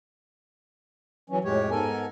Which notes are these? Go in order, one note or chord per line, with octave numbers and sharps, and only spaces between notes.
E3 F#3 C#4
F2 A2 G#3 G4 C#5
G#2 B3 A4 A#4 G#5